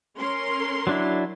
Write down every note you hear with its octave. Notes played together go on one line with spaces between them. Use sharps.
C#4 A#4 C6
F#3 D4 E4